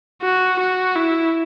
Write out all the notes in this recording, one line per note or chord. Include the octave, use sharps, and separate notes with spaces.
F#4
F#4
E4